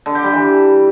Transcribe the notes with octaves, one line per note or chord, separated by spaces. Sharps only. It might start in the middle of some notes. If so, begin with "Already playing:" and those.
D3
G4
G3
E3